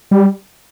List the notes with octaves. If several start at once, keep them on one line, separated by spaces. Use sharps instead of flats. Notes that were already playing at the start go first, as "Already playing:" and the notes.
G3